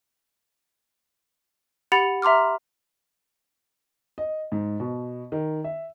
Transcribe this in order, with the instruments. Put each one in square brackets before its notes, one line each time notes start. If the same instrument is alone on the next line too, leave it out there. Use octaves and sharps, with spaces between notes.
[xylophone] G4 F#5 B5 A6 C#7 F7
E5 A#5 C6 D6 F6
[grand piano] D#5
G#2
B2
D#3
E5